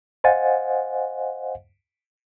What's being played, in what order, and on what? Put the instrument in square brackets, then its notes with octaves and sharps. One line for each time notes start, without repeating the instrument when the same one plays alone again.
[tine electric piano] C5 D#5 F5 F#5 G#5 A6